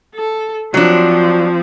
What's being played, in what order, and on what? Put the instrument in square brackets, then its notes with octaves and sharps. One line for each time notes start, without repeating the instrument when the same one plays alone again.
[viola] A4
[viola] F3 C4 [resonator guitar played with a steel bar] F#3 D4